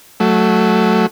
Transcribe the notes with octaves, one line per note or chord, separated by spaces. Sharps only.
F#3 A3